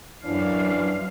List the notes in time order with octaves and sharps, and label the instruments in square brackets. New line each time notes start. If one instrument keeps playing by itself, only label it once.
[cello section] F#2 F5 [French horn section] E3 D4